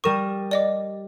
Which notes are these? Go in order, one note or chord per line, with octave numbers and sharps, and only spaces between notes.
G3 A#4 C#6 D#6 E7
D5 D#5 D6